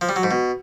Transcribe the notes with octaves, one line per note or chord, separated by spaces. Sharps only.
F3
G3
F#3
G#2
B2